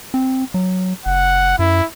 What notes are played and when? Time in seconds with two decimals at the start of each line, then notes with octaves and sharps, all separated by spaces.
0.14 C4
0.54 F#3
1.06 F#1 F#5
1.59 F#2 E4